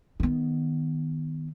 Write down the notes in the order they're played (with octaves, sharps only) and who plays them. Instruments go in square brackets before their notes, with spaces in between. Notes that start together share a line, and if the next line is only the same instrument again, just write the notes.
[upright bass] D#3 B3